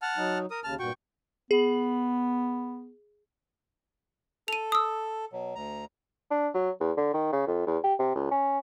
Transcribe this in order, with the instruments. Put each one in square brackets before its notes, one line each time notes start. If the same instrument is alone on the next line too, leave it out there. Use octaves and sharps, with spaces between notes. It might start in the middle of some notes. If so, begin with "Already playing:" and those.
[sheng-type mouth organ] F#5 A5 F6
[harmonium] F#3 D#4
[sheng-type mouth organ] A#4 D#6
[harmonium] D#2 C#3 [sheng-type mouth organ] A5 F6
[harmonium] G2 A#2 F#4 [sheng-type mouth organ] G5 C#6
[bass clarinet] B3 [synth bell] G#4
[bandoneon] A4 [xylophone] D#7 F7
[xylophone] D#6 E6
[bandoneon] B2 F#3
D2 A#5
[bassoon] D4
F#3
E2
D3
D#3
C#3
F2
E2
G4
C3
C#2
C#4